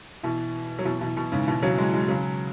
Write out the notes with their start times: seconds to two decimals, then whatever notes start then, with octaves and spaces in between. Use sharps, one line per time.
0.23 B2 E3
0.79 F#3
0.85 B2 E3
1.01 B2 E3
1.17 B2
1.32 G#2 C#3
1.47 B2 E3
1.62 C#3 F#3
1.78 E3 G#3
1.93 E3 G#3
2.08 C#3 F#3